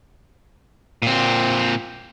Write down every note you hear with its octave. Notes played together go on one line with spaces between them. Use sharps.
A#2 C4